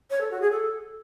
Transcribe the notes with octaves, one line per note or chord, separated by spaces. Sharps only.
C#5
A4
F#4
G#4
A4